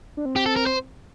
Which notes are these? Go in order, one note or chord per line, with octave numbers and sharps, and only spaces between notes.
D4
C4
G4
A4
A#4
C5